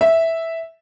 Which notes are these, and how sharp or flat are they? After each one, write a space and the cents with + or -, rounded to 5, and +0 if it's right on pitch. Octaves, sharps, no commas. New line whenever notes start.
E5 -5